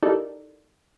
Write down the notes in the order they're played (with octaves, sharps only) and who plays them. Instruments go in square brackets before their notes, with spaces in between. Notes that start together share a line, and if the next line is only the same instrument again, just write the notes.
[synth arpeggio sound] D#4 E4 G4 A4 A#4 D5